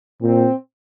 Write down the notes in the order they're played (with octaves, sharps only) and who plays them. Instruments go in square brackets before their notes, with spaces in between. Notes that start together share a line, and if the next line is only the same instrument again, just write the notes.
[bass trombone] A#2 [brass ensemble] C4